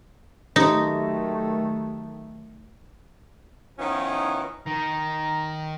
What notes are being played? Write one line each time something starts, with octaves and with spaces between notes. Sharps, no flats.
D#3 F#3 A3 D#4 G4 D#6 A#6
D#3 F3 B3 C#4 D#4 E4
D#3 A#5